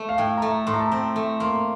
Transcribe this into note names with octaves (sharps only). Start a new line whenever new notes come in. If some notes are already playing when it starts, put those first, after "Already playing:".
Already playing: A3
F5
A2 G5
A#5
A3 A5
A2 C6
A#5
A5
C4 A#5
A3
A#3 C6